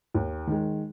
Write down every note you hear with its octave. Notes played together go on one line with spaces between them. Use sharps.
D#2
D#3 G#3